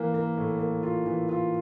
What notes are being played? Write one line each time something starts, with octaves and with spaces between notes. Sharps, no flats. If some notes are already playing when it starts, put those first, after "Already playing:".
Already playing: E3 A#3
A#3
A2
A#3
F4
E3
F4